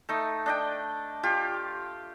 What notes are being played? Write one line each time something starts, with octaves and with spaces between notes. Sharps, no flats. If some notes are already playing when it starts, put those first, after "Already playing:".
A3 D#4
D4 D#5 G5
F4 G4